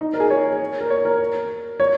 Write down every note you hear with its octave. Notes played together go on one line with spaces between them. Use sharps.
D#4
A#4
G#4
C#5
A#4
C#5
A#4
C#5